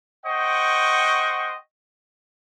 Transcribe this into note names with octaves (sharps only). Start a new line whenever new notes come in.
C5 D#5 F#5 G5 C#6